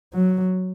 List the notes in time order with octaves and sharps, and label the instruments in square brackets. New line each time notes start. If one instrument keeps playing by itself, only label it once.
[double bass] F#3